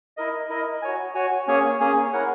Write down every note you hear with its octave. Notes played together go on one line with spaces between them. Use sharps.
E4 A#4 D#5
E4 A#4 D#5
F#4 C#5 G#5
F#4 C#5 G#5
A#3 C#4 G#4 C#5 G#5
A#3 C#4 G#4 C#5 G#5
E4 A#4 C#5 F#5